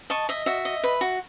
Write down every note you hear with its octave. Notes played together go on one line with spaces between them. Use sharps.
D#5 A5 C#6
D#5 E5
F#4 E5
D#5
B4
F#4